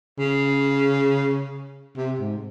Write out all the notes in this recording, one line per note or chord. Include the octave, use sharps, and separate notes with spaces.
C#3
C3
G#2